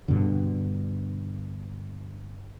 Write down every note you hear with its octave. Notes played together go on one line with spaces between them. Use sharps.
G2 B2 D3